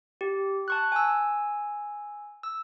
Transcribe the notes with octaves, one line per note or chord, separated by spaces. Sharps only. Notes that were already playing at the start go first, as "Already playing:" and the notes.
G4
A5 C#6 F#6
G#5 E6
E6